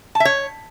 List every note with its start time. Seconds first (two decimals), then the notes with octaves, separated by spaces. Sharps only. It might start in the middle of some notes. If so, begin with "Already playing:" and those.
0.15 A5
0.20 E5
0.25 C#5